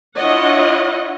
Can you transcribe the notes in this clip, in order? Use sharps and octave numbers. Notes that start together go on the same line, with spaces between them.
D4 E4 F4 C#5 D#5 F#5